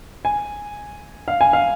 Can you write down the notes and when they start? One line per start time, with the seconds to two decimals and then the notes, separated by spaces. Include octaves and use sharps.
0.25 G#5
1.28 F5
1.41 G#5
1.53 F5